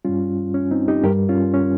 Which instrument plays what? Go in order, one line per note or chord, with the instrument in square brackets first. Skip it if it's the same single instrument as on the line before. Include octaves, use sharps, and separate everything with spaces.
[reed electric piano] G2 G3 C#4 F4
C#4
C4 D#4
D#4 G4
G2 G3 G4 A#4
C#4 F4
C#4